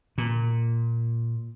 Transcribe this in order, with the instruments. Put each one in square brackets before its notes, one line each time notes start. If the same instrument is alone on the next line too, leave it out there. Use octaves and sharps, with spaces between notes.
[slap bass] A#2